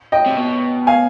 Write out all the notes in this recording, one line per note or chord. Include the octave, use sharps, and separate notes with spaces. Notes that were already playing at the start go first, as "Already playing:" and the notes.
D#5 G5
C3
B2
F5 G#5